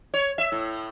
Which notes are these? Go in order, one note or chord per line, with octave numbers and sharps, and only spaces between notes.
C#5
E5
A2